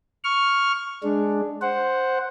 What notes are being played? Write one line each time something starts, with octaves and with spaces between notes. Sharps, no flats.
C#6 F6
G#3 D4
C5 F#5